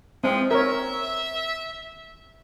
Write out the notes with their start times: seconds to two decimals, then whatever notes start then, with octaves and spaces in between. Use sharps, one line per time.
0.24 E3 F3 G#3 C4
0.51 A#4 C#5 E5